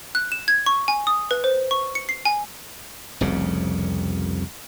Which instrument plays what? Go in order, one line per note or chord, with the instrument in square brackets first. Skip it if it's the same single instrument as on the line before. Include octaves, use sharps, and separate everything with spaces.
[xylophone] F#6
E7
G#6
C#6
G#5
D#6
B4
C5
C#6
C#7
C7
G#5
[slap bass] F1 C2 F2 C#3